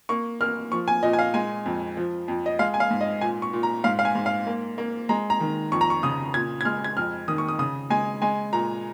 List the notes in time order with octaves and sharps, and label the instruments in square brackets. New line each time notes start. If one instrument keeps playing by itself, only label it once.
[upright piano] A#3 C#6
A#3 F6
F3 C#6
G#5
A#2 D#5
G#5
F5
G#3 G#5
F2
F3
F2
D#5
G#3 F5
G#5
F5
G#2
D#5
A#2 G#5
C#6
A#2
A#5
G#2 F5
F5
G#5
G#2
F5
A#3
A#3
G#3 A#5
A#5
D#3
F2 C#6
A#5
C#6
C#3 D#6
A#2 G#6
G#6
G#3 F6
G#6
F2 F6
D#3 D#6
C#6
D#6
C#3 D#6
G#3 G#5
G#3 G#5
A#2 A#5